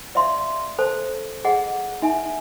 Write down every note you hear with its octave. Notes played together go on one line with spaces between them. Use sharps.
D5 E5 F5 C6
A4 C5 A5
G#4 D#5 F#5
D#4 E5 G#5